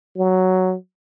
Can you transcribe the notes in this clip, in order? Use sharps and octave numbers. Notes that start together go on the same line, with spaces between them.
F#3